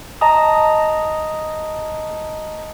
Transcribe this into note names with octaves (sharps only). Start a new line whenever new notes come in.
D#5 A5 A#5 D#6